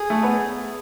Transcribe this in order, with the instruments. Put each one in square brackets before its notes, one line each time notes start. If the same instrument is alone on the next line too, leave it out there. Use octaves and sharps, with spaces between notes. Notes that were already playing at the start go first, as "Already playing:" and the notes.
Already playing: [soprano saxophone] G#4
[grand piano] A3
B3